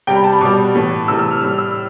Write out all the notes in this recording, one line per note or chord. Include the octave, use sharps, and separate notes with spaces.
C3 G3 G5
B5
A5
B5
B2 G3 D6
A2 E3 A3
C3 E3 A3 E6
E6
F6
A2 G3 F6
E6